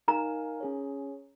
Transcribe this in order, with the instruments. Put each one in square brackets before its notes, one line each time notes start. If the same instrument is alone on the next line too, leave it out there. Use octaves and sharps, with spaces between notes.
[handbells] D#4 A#4 F5 G#5 [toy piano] A#5
[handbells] C#4 G#4 C#5